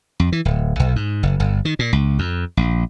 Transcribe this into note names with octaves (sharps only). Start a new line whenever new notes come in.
F2
E3
D1
B1
G#2
F#1
G1
D#3
A#2
C#2
F2
A#1